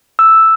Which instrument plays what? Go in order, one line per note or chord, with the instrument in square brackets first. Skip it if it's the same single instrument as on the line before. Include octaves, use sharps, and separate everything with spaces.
[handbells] E6